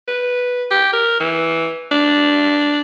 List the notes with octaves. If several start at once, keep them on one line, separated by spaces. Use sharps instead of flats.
B4
G4
A#4
E3
D4